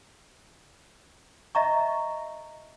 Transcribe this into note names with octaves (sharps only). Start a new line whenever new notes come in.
D#5 E5 A#5 C#6